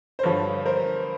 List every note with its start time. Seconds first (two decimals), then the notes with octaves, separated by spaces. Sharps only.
0.19 C5
0.23 G2 D3 F3 B4 C#5
0.66 A#4 C5